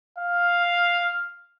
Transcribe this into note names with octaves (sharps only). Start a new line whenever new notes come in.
F5